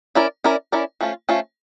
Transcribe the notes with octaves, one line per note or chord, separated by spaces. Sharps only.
C#4 E4 A#4 D5
C#4 E4 A#4 D5
C#4 E4 A#4 D5
F3 A3 C#4 F4
F3 A3 C#4 F4